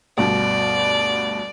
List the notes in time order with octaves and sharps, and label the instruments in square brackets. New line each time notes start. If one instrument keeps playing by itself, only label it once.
[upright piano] D2 G2 B2 [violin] D5